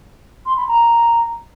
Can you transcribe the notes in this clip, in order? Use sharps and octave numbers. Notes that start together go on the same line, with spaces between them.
C6
B5
A#5